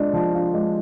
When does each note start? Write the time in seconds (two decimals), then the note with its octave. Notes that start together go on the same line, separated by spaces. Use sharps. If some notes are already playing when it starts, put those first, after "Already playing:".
Already playing: G#3 D4 F4
0.13 F3
0.33 F4
0.54 G#3